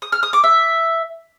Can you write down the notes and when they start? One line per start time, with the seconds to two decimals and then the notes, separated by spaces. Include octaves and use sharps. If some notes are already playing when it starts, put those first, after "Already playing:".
0.02 D#6
0.12 F6
0.23 D#6
0.33 D6
0.44 E5